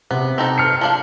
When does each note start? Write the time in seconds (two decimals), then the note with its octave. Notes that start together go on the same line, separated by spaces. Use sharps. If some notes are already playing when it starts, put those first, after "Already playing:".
0.11 C3 B3
0.38 C4 D#4 A4
0.58 F6 C#7
0.81 F3 D4 F5